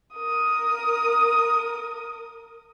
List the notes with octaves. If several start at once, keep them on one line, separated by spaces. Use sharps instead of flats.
A#4 D#6